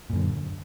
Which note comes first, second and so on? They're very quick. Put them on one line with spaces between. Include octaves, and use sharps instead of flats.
A#2 F#2 D3